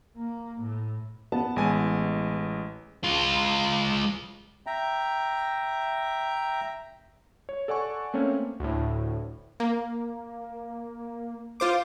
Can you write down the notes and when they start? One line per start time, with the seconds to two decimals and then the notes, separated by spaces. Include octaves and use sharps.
0.17 A#3
0.61 A2
1.32 B3 A5
1.56 A1 G#3 G#5
3.04 G#3 F4
4.66 E5 G5 A#5
7.49 C#5
7.68 A4 D5 F#5 G#5 C#6
8.14 A3 A#3 C4 C#4 C#5
8.60 D2 A2
9.60 A#3
11.60 F4 C5 D6